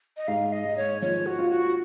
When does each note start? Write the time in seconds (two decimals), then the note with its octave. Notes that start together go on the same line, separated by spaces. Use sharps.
0.17 D#5
0.28 G#2 F5
0.52 D#5
0.65 G#2
0.77 C#5
1.02 F3 C#5
1.26 F#4
1.39 F4
1.50 F#4